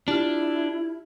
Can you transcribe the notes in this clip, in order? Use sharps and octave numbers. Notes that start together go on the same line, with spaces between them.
D4 E4 F4 G4 F6